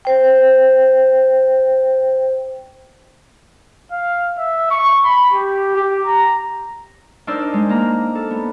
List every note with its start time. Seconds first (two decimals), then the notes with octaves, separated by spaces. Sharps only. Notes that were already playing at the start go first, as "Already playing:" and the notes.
0.05 C5 G5
3.92 F5
4.38 E5
4.71 C#6
5.05 B5
5.33 G4
5.76 G4
6.06 A#5
7.27 D4 D#4 A#4 C5 D5 E6
7.53 G#3
7.69 A#3 A#5
8.15 A4
8.30 B3